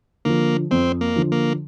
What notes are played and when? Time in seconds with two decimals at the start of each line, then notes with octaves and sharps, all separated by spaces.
0.25 D3 F3 A#3
0.71 F2 C4
1.01 A#3
1.16 D3 F3
1.32 A#3